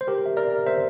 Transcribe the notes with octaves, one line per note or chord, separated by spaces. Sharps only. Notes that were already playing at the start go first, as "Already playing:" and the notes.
C5
G4 A#4
E5
A#4 D5
C5 E5